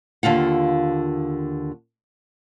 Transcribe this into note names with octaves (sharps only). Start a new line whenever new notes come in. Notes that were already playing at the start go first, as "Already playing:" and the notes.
D#2 D3 F4 F#5